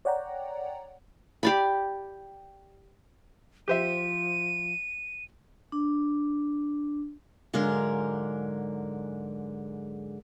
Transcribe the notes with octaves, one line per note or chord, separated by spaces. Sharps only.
C#5 D5 F#5 G5 A#5
G4 D5 B5
F3 G4 C5 E5 D#7
D4
G#2 D3 F#3 G#3 A#4 F5